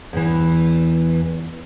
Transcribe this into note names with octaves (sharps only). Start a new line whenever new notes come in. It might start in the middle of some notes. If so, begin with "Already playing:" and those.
E2 E3